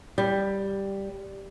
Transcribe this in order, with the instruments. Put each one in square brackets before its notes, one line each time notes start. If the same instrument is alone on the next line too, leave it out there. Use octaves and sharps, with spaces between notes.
[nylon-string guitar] G3